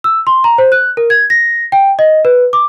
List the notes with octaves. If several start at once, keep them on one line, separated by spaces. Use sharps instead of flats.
E6
C6
A#5
C5
F#6
A#4
G#6
A#6
G5
D#5
B4
D6